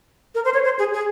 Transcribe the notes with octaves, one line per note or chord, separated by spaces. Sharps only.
A#4
C5
C#5
C5
G#4
G#4